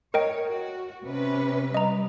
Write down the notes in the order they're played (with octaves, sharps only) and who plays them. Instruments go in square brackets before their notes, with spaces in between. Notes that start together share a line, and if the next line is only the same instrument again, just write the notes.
[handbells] A#4 D#5 G5 [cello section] C#5
[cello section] F#4
C3 C#4 B4
[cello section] G3 [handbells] D#5 A#5